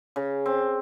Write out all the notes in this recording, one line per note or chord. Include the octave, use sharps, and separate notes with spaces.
C#3
C4